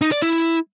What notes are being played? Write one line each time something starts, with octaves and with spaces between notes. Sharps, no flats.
D#4
D5
E4